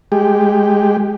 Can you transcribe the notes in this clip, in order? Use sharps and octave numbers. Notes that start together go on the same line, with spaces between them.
G#3 G4